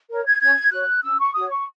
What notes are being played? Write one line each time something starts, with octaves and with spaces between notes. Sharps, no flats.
A#4 C#5
G#6
C#4 G#6
F#4 C#5 F#6
C#4 E6
C#6
F#4 C#5 D#6
C#6